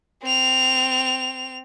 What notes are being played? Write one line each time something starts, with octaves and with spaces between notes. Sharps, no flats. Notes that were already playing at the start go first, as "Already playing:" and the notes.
C4 F7